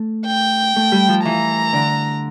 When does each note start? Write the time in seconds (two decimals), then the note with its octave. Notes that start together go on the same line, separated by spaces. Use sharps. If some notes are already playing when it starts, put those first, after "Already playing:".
Already playing: A3
0.26 G5
0.76 A3
0.92 G3
1.09 F3
1.24 E3 A#5
1.73 D3